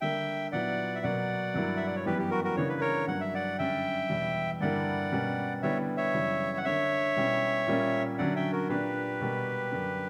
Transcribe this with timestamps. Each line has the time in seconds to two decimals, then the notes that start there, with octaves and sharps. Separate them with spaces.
0.01 D3 G3 A#3 E5 G5
0.52 A#2 F#3 B3 E4 D5 F#5
0.95 E5
1.03 B2 F#3 A#3 D5 F#5
1.54 G2 F#3 A#3 E4
1.77 E5
1.87 D5
1.96 C#5
2.06 F#2 E3 G3 B3 G4 B4
2.19 G4
2.31 F#4 A#4
2.44 F#4 A#4
2.56 C#3 E3 A#3 D4 C#5
2.69 B4
2.81 A#4 C#5
3.07 G2 F#3 A#3 D4 F#5
3.21 E5
3.34 D5 F#5
3.58 F#2 D3 G3 C#4 E5 G5
4.10 E2 B2 G3
4.60 G2 D3 G3 A#3 E4 D5 F#5
5.12 B2 G3 A#3 C#4
5.63 D3 G3 B3 E4 C#5 E5
5.97 C#5 E5
6.15 F#2 C#3 E3 G3
6.57 F#5
6.65 D3 A#3 D4 C#5 E5
7.16 B2 G3 C#4 E4
7.67 A#2 G3 A#3 C#4
8.18 D3 F#3 C#4 D5 F#5
8.36 E5 G5
8.53 F#4 A#4
8.69 A#2 A#3 D4 G4 B4
9.21 B2 G3 A#3
9.72 F#2 D3 A#3 D4